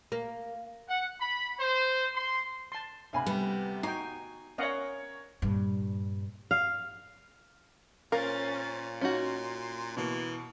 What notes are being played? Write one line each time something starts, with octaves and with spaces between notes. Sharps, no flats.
A#3
F#5
B5
C5
C6
A5 C6
D2 C3 F5 G#5 B5
G3 B3 B4
D#4 F#4 G5 G#5 A#5 C#6 C7
C#4 A#4 C#5 D#5 F5 F#5
G2 A#2
F5
A#2 C#4 A#4 C5 F5 A6
C#4 D#4 F#4 C6
B2 E3 A#3